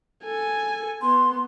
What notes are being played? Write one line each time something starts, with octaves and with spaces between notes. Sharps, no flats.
A4 G#5
B3 C6